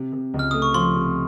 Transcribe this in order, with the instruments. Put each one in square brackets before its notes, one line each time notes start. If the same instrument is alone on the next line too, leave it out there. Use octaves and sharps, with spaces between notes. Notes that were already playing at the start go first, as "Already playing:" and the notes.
Already playing: [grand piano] C3
C3
C#2
[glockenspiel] F6
[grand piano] A3 [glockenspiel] D#6
[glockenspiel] C#6
[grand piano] F3 [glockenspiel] C6
[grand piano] C3